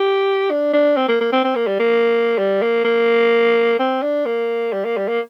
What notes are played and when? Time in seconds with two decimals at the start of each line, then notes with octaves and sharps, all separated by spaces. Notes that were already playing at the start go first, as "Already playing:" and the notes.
Already playing: G4
0.51 D4
0.73 D4
0.97 C4
1.08 A#3
1.21 A#3
1.33 C4
1.44 C4
1.56 A#3
1.67 G3
1.80 A#3
2.38 G3
2.62 A#3
2.85 A#3
3.79 C4
4.02 D4
4.25 A#3
4.73 G3
4.85 A#3
4.97 G3
5.08 A#3